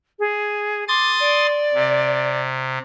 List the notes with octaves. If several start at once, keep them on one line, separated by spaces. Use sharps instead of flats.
G#4
C6 D6 D#6 A6
D5
C3